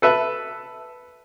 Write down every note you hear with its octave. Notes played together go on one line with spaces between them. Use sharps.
A4 B4 E5